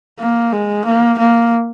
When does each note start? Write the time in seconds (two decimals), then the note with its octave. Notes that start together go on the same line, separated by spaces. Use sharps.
0.19 A#3
0.52 G#3
0.85 A#3
1.18 A#3